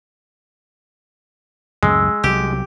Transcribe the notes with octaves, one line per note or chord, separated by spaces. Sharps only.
C#2 F#2 A2 G#3 E6
C2 F#3 G4